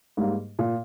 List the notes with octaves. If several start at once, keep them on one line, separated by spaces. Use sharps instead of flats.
G#2 G3 A#3
A#2